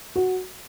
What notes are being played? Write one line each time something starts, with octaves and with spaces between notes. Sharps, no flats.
F#4